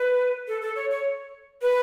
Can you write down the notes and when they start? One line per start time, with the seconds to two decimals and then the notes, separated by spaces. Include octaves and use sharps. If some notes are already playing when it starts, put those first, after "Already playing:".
Already playing: B4
0.48 A4
0.62 A4
0.76 C#5
0.91 C#5
1.62 B4